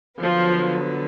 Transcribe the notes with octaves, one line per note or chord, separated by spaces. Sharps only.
D3 F3 F#3 B3